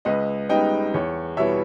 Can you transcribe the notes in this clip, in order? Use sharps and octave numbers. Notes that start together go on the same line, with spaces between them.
C#2 B4 D#5
C#3 G3 B3 D#4 D#5 G5
E2 C#5
B2 G3 B3 E4 C#5 E5